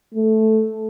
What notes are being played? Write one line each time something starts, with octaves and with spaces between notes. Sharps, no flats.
A3